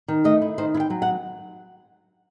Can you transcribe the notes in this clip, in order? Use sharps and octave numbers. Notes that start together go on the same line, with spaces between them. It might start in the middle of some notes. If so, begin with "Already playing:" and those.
D#3
A3 D#5
E4
D#3 C5
E4
G5
F#3
F#5